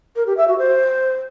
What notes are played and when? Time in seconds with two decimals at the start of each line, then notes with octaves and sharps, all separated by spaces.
0.16 A#4
0.26 G4
0.37 E5
0.48 F#4
0.58 C5